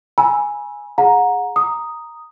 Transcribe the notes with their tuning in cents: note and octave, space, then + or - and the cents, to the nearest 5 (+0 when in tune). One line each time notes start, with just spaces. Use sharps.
G#5 +0 B5 -40 E6 +0
G#4 +0 F#5 -30 A#5 +5
A#5 +0 D#6 +0